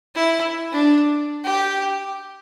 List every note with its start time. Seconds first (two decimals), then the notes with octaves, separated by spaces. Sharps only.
0.15 E4
0.72 D4
1.44 G4